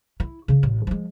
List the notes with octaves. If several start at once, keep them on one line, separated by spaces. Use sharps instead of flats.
E4
C#3 C#4
A1
F3 G#3